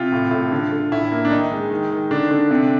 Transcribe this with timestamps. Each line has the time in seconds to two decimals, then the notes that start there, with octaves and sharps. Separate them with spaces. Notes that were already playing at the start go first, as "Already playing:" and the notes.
Already playing: C3 F4
0.13 A2
0.31 A2
0.52 D3
0.72 D3
0.92 A2 E4
1.12 A#3
1.25 D4
1.31 D#3 D#4
1.52 G#3
1.70 D#3
1.91 D#3
2.11 D3 D4
2.31 D3
2.50 C3